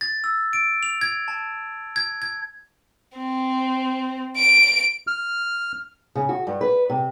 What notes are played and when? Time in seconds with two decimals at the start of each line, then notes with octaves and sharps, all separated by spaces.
0.01 A6
0.24 E6
0.53 D7
0.83 F7
1.01 G#6
1.28 A5
1.96 G#6
2.22 G#6
3.18 C4
4.37 D7
5.07 F6
6.15 C#3
6.29 F#4
6.47 G2
6.61 B4
6.90 C3